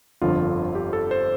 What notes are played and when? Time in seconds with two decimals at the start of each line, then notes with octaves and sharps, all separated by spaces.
0.21 G1 F2 D3 F3 F4
0.75 G4
0.93 A4
1.11 C5